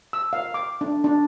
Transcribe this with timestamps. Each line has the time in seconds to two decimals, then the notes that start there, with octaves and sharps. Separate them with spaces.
0.13 E6
0.33 F5
0.54 D6
0.81 D4
1.04 D4